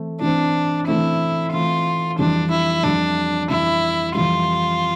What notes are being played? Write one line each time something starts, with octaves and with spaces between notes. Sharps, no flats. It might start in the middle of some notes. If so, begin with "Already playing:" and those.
Already playing: E3 A3 C4
E3 A3 C4 D4
E3 A3 C4 E4
E3 A3 C4 F4
F2 E3 G3 D4
E4
F2 E3 G3 D4
F2 E3 G3 E4
F2 E3 G3 F4